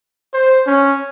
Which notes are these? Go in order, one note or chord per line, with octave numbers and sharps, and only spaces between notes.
C5
C#4